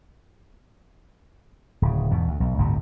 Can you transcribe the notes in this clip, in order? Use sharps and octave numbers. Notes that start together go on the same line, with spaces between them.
D1 C#3
E2 G#2 B2
D2
B1
G1 D2 A2 C3